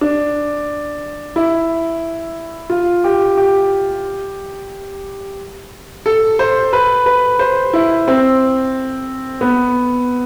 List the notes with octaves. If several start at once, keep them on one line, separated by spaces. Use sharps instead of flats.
D4
E4
F4
G4
G4
A4
C5
B4
B4
C5
E4
C4
B3